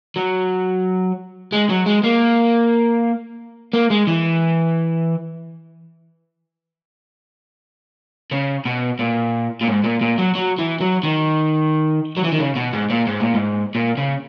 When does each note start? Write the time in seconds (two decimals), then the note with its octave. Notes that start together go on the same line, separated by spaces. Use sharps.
0.16 F#3
1.53 G#3
1.70 F#3
1.86 G#3
2.04 A#3
3.73 A#3
3.90 G#3
4.07 E3
8.31 C#3
8.66 B2
8.99 A#2
9.61 A#2
9.68 G#2
9.84 A#2
10.01 A#2
10.18 F#3
10.35 F#3
10.58 E3
10.80 F#3
11.03 D#3
12.17 F#3
12.24 E3
12.32 D#3
12.38 C#3
12.56 B2
12.73 G#2
12.90 A#2
13.07 G#2
13.20 A#2
13.34 G#2
13.75 A#2
13.97 C#3